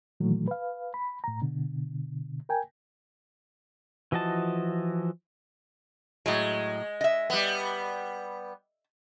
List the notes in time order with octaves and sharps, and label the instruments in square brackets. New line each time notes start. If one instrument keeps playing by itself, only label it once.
[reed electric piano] A#2 D#3 E3 F#3 A3
B4 F5
B5
A2 A#5
B2 D3
A#4 G5 G#5
[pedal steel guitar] E3 F3 F#4 D#5 A5
[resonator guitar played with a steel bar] A2 F#3 [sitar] G#3
[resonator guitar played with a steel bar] D#5 E5
[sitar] G3 B3